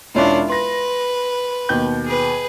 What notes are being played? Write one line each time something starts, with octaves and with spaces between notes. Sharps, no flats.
E1 C#4 D4 E4 F4
B4 C6 A#6
D#2 B2 G6
G#4 B4